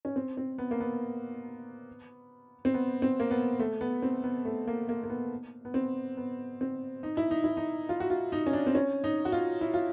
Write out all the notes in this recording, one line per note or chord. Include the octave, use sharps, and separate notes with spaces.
C#4
C4
C4
B3
A#3
B3
C4
B3
C4
A#3
B3
A3
B3
C4
B3
A3
A#3
A#3
A#3
B3
B3
C4
B3
C4
D#4
E4
D#4
E4
D#4
F4
F#4
F4
D#4
C#4
D4
C4
C#4
D#4
F#4
F4
E4
F4